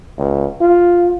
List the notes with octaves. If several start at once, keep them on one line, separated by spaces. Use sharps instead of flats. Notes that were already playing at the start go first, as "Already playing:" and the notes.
C#2
F4